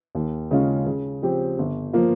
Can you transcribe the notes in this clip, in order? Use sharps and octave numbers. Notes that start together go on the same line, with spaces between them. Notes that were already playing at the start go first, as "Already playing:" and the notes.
D#2
C#3 G#3 C#4 F4
C#3
F3 C4 G4
G1
F3 A#3 F4